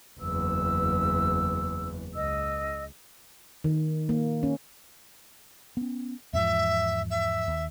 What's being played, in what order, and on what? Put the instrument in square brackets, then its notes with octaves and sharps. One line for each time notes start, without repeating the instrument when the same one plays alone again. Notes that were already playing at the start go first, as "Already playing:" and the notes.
[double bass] F#1 E2 [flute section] E6
[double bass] C#2 [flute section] D#5 E6
[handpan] D#3
A#3
C#4
[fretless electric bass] B3 C#4
[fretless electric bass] E2 G#2 F3 [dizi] E5
[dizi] E5
[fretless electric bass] D#2